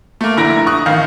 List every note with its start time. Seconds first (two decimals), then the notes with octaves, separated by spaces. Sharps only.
0.21 A3 A#3
0.37 F1 D3 E4 A#5 A#6 D7
0.67 C#6 D#6 F#6
0.86 A1 D#3 F5